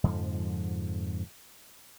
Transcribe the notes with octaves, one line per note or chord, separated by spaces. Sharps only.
F2 G#2 D3 F3